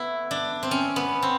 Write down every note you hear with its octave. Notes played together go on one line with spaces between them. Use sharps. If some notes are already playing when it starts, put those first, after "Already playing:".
Already playing: A3 B3 E4
D4
C4
C#4
B3
C4